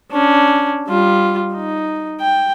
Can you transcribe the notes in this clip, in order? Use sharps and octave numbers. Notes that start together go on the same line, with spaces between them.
C#4 D4
G3 F4
D#4
G5